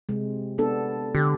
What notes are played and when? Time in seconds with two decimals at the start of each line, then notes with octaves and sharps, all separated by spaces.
0.09 C3 G#3
0.58 B3 D4 A4
1.15 D3 G4